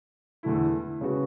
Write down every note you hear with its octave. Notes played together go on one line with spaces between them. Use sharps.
E2 D3 A3 E4
C#3 G#3 B3 F#4